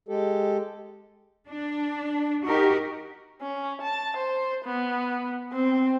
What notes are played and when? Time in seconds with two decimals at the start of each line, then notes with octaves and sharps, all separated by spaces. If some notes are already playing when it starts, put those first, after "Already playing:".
0.08 G#3 G4 A4
1.49 D4
2.45 D#4 F#4 G4 A#4
3.42 C#4
3.82 A5
4.17 C5
4.65 B3
5.53 C4